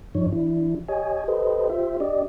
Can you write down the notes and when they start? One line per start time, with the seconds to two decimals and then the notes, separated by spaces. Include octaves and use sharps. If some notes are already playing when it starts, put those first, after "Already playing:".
0.15 G2 F3 D4 D#4 C#5
0.32 E3 D4 E4
0.88 G4 C#5 D#5 G#5
1.28 G4 A4 B4 C5 D#5
1.70 F4 G4 C5 E5
2.00 D4 G4 D5 D#5